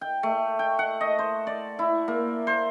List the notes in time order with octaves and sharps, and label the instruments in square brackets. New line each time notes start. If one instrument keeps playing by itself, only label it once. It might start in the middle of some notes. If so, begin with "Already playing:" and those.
[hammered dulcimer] G5
A3
G5
F#5
D#5
C5
D5
E4
A#3
C5